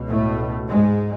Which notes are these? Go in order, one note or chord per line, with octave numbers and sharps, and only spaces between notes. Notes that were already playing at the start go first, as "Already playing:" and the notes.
Already playing: C#2 B2
A2 A3
G#2 G#3